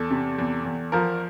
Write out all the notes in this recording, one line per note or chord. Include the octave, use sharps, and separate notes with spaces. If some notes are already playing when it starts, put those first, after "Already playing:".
Already playing: E2 A4
C3
E2
E2
F3 A#4